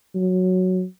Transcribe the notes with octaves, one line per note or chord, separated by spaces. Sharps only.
F#3